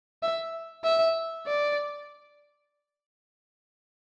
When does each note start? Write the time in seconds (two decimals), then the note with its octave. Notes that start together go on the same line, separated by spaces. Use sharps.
0.23 E5
0.84 E5
1.47 D5